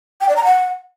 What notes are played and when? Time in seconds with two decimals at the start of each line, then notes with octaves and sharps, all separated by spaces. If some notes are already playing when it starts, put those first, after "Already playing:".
0.21 G5
0.29 D5
0.36 A#5
0.44 F#5